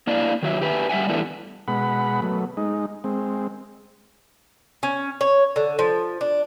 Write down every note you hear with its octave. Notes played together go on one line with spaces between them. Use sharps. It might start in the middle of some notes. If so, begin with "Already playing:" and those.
A#3 D4 E4 D5 D#5 F5
D#3 F#3 E5
G4 B4 E5 G#5
G3 E5 F#5 G#5
E3 G3 A3 B3 D4
B2 G#3 F#5 B5
F#3 A3 B3
G#3 D#4
G#3 C4
C#4
C#5
D3
F3
D4